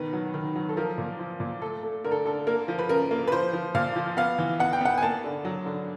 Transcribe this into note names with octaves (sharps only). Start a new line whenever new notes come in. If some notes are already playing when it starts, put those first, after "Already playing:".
Already playing: B2 D#3 B4
F#3
D#3
F#3
A4
F3 A#4
A#2
F3
A#2
A3 A4
A3
D3 A#4
A4
D3 A4
A#3 A#4
F3
B4
C#3 A#4
A#3
B4
F3 C5
F3
A#2 F5
F3
B3 F5
E3
B3 F#5
G5
B3 F#5
G#5
A#3 A5
D3
F#3
D3